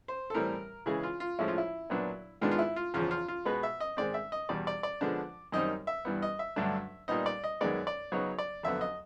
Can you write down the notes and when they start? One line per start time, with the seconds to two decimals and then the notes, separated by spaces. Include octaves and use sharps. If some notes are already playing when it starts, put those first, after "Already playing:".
0.08 C5
0.30 A4
0.34 A2 E3 G3 C4 A#4
0.86 C#3 E3 G#3 G#4
1.03 F4
1.20 F4
1.39 A2 F3 G#3 C#4 E4
1.48 F4
1.58 E4
1.90 A#2 F#3 B3 D4
2.41 G#2 D#3 G#3 B3 D4 F4
2.51 F4
2.59 E4
2.76 F4
2.94 E2 C#3 F3 F4
3.11 F4
3.28 F4
3.45 B2 G#3 B3 B4
3.63 E5
3.80 D#5
3.97 G#2 D#3 G#3 C4 D5
4.14 E5
4.32 D#5
4.49 E2 B2 G3 D5
4.67 D5
4.83 D5
5.01 D3 F3 G#3 B3 D4
5.52 F#2 D#3 G3 C4 D#4 D#5
5.87 E5
6.05 G2 E3 G3 B3
6.22 D#5
6.39 E5
6.56 G2 D3 F#3 A3 D4
7.08 A#2 G3 B3 D#4 D#5
7.26 D5
7.44 D#5
7.61 F#2 D#3 G#3 B3 D5
7.87 D5
8.12 C#3 F#3 B3 D#4 C#5
8.38 D5
8.63 F2 D3 F#3 B3 E5
8.81 D#5